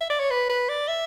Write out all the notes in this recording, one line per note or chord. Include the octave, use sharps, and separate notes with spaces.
E5
D5
C#5
B4
B4
D5
E5